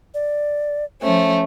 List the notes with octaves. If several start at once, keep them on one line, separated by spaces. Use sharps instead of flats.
D5
F3 A3 C#4 C5